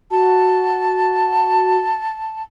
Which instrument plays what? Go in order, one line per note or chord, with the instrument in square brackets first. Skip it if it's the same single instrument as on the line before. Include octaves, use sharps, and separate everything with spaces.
[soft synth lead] F#4 [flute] A5